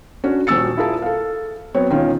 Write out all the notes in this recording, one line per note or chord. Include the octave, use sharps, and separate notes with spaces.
C#4 D4 F#4 C#5
D#1 F#4 E6 A6 C#7
E4 F4 G#4 A#4 F5 A5
A4 F5
F#3 B3 C4 C#5
E1 D#3 C#4 F4